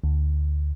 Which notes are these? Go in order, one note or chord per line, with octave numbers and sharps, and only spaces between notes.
D2